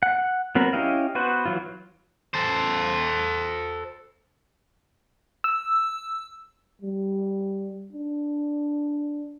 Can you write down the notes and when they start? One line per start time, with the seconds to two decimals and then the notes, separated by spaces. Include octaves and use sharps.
0.03 F#5
0.55 F#3 B3 C4 A#4 B5
0.73 C#4 E4 G4 D#5 F5
1.15 B3 F#4 B4 C5
1.46 E3 F#3 F4
2.34 A4 C5
5.44 E6
6.82 G3
7.93 D4